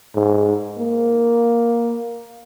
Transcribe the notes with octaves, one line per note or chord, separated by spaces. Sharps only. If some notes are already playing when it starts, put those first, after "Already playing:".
G#2
A#3